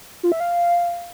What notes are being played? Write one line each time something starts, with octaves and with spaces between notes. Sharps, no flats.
F4
E5
F5